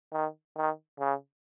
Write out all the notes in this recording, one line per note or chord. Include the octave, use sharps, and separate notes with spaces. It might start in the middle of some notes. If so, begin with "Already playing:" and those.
D#3
D#3
C#3